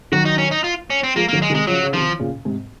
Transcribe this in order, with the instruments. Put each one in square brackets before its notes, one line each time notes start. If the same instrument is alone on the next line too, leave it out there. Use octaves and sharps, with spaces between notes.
[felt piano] D#3 F#3 [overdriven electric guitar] F#4
[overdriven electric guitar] D#4
C#4
D#4
F4
C#4
C4
[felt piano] F3 G#3 [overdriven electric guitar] A#3
[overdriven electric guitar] A#3
[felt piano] D#3 F#3
[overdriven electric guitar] G#3
[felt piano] C3 D#3
[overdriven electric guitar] G#3
[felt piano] C#3 F3 [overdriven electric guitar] F#3
[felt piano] C#3
[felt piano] C3 D#3 [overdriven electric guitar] F3
[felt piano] A#2 C#3
G#2 C3